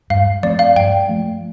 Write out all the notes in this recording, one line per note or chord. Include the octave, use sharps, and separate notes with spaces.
G2 F5
F3 A3 C4 D5
F5
G2 G5
F3 A3